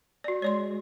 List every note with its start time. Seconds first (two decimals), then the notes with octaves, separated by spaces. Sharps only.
0.24 F#4 D5
0.42 G#3 C#5 D5 C6